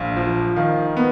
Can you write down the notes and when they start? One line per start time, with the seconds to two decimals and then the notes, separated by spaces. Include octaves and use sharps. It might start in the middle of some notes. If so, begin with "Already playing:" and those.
Already playing: A#1 F5
0.16 F3
0.56 D#3 F5
0.97 B3